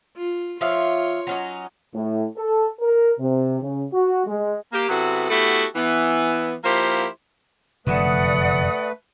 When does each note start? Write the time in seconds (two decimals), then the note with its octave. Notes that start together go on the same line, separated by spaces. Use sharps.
0.16 F4
0.61 F3 F4 C#5 E5 F5 C6
1.27 F#3 C#4 D#4
1.95 A2
2.38 A4
2.81 A#4
3.20 C3
3.61 C#3
3.93 F#4
4.26 G#3
4.73 A#3 G4
4.89 C3 F#3 B3 E4 F#4 A4
5.30 A3 B3 E4 F#4 G4 A4
5.76 E3 B3
6.64 F3 A#3 E4 G4 A#4 C5
7.87 F1 F#2 D3 A3 B4 D5 F#5 D#6